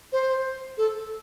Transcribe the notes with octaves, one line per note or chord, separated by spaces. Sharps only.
C5
A4